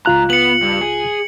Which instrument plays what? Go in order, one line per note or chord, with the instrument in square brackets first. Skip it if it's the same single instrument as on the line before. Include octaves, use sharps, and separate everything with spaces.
[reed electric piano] C#2 F4 F#6 [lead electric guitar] G#2 A#5
[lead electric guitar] B3 [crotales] C#7 F#7
[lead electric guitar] G2
G#4